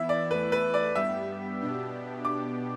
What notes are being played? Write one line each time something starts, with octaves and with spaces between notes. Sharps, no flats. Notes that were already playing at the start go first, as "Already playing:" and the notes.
Already playing: E3 B3 E4 E5
D5
E2 E3 A3 B4
B4
D5
G2 G3 B3 G4 E5
B2 B3 D4 G4
D6